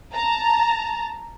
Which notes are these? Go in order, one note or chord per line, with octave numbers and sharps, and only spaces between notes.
A5 A#5